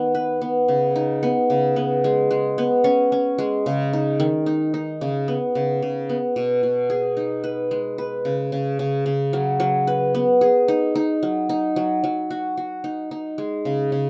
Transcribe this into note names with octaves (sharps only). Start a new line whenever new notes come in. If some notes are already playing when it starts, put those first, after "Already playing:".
Already playing: D#3 B3
B4
B3
C#3
D#4
B3
C#3
B3
G#3
G#3
B3
C#4
C#4
G#3
C#3
D#4
D#3
D#4
D#4
C#3
B3
C#3
C#3
B3
B2
B2
G#4
D#4
B4
G#3
B4
C#3
C#3
C#3
C#3
F#3
F#3
B4
B3
G#4
D#4
D#4
F#3
D#4
F#3
F#3
F#4
F#4
D#4
D#4
G#3
C#3
C#3